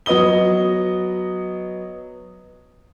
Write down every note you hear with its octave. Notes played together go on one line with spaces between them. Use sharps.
F#3 B3 D#5 D#6 G7